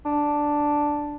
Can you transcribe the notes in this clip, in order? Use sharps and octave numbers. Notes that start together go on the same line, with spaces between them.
D4